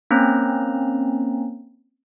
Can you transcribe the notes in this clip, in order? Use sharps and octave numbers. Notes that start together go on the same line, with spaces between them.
A#3 C4 C#4 A#5